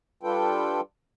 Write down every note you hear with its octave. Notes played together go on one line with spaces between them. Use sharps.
G3 D4 F4 A4 B4 G5